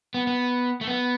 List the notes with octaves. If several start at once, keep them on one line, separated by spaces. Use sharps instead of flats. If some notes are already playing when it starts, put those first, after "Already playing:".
B3
B3
A3
B3